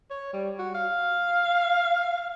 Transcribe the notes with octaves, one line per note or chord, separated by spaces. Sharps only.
C#5
G3
F#4
F5